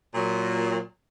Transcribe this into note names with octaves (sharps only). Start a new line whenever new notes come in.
A#2 F#3